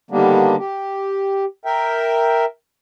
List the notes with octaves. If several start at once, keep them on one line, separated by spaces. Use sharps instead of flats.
D3 D#3 G3 A#3 B3 D4
G4
A#4 E5 G5